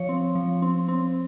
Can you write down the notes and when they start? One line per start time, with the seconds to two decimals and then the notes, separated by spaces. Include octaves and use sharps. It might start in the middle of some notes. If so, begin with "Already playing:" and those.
Already playing: F3 C#5
0.09 C4
0.35 F3
0.62 C4
0.88 C4